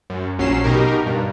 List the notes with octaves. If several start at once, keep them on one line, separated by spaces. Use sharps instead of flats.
F#2
A#1 F#3 C#4 C7 E7
B2 D#4 G4 A#4
G2